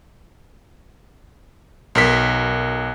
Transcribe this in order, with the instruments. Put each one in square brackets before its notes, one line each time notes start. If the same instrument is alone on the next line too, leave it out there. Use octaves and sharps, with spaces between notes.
[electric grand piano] B1 A#4 B6